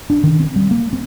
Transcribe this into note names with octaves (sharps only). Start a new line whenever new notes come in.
D4
D#3
C4
G3
A#3
C4